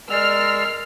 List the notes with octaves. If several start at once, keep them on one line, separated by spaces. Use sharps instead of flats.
G#3 A#4 D5 E6 F6 C7